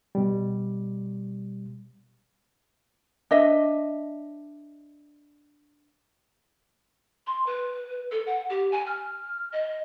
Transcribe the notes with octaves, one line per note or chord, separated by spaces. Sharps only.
B2 G3
D4 D#5 E5
C6
B4
A4
F#5
G4
G#5
F6
D#5